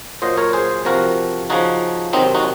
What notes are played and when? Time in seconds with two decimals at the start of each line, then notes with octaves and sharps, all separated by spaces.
0.22 A#2 F#3 C5 D#5
0.37 A#4 C#5
0.53 G#4 C5
0.85 C3 F3 F#4 A#4
1.50 C#3 F3 D#4 F#4
2.13 C3 D#3 F#3 C4 D#4
2.35 D#4 F#4